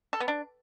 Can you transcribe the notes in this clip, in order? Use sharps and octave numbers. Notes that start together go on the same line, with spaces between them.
A4
B3
D4